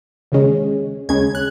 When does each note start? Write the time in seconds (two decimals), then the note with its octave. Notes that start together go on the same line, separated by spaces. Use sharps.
0.32 D#2 C#3 G#3 C#4
1.09 D#2 C#3 G#3 C#4 G#6
1.35 F#6